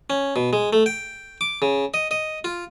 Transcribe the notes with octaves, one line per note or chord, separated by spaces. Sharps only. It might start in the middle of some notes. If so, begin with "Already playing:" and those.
C#4
B2
G#3
A3
G5
D6
C#3
D#5
D#5
F4